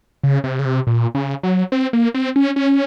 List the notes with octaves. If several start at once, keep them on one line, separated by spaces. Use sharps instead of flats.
C#3
C3
C#3
C3
A#2
C#3
F#3
C4
A#3
C4
C#4
C#4